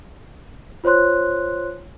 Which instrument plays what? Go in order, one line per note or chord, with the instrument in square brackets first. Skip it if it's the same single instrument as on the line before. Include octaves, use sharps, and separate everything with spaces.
[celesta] F4 C5 C#5 C6 F#6